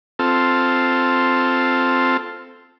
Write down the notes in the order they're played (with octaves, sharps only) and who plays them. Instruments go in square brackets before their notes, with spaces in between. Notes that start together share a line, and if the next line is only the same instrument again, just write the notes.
[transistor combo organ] C4 F4 A4